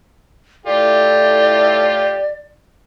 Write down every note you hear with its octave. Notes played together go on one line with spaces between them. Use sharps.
A2 E4 F4 G4 A4 D5